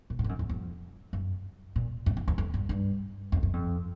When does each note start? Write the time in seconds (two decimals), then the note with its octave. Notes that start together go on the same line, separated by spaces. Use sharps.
0.10 A#2
0.19 A2
0.24 G2
0.29 F#2
0.39 E2
0.49 F2
1.13 F#2
1.76 A#2
2.06 F#2
2.17 F2
2.28 E2
2.38 F2
2.54 G2
2.69 G2
3.32 F2
3.43 F#2
3.53 F2